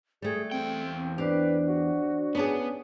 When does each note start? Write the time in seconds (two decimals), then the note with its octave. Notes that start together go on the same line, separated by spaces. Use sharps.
0.22 G3 A3 G#4
0.52 E2 C4 G5
1.18 D4 G4 B4 C5 D5
1.67 F#4
2.35 B3 C#4 D4 G#4